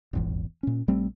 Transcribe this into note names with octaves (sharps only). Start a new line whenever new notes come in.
D#1 G#1 E2
A#2 C#4
A#1 G3 A3 C4